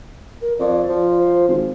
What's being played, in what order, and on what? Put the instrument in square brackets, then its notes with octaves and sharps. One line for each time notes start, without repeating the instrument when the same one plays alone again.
[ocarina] A#4
[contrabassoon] F2 [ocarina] D5
[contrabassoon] F3
[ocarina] C5
[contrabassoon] G#1